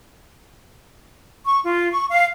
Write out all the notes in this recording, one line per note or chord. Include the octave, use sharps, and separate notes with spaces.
C#6
F4
C#6
F5